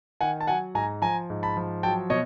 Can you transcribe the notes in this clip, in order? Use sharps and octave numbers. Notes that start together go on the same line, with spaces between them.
D#3 F#5 G#5
A5
F#3 F#5 G#5
G#2 G#5 A#5
F3 G#5 A#5
G#2
A5 B5
F3
F#3 G5 A5
B2 C#5 D#5